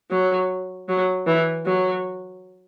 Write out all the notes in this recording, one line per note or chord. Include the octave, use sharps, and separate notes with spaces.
F#3
F#3
E3
F#3